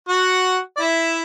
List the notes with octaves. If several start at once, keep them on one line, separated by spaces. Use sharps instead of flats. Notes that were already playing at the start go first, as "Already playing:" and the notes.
F#4 F#5
D5
E4 E5